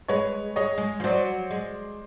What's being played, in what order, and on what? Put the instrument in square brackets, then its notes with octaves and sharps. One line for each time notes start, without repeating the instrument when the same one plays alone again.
[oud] G#3 [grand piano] B4 C#5
[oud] G#3 [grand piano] C#5 D#5
[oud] G#3
F3
[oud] F#3 [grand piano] C5 D5
[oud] G#3